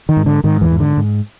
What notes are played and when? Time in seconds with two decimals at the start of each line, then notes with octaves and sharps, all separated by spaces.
0.09 D#3
0.17 G#2
0.26 D3
0.44 G#2 D#3
0.61 E2 E3
0.71 G#2
0.80 D3
0.97 G#2